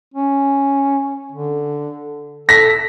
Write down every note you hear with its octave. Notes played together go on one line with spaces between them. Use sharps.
C#4
D3
A4 A#6 B6